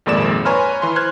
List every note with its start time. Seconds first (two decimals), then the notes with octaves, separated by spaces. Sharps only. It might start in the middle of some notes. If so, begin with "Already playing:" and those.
0.06 G#1 F2 A#2 G#3 D5 E7
0.45 B4 C#5 G#5 A#5 C6 F6
0.82 E3 C6
0.96 C5 F6 F#6 G#6